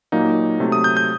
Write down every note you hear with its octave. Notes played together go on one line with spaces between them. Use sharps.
A#2 F#3 A#3 D#4
C3 F#3 A3
D#6
G6
G6